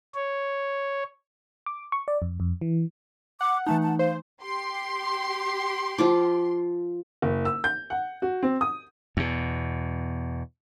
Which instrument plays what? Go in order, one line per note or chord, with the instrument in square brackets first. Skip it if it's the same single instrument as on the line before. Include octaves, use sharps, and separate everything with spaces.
[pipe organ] C#5
[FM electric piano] D6
C#6
D5
F2
F2
E3
[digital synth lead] F#5 [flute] D6
[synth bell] E3 A3 D#4 [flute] A5
[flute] A5
[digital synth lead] C5 [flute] F5
[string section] G4 C6
[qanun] F3 F4 D6
[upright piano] F#1
E6
G6
F#5
F#4
C4
D#6
[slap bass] E2 B2